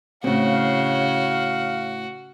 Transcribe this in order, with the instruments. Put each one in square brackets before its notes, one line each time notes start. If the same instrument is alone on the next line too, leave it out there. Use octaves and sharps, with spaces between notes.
[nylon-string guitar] A2 C4 [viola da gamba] C#3 [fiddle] F#4 [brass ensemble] F5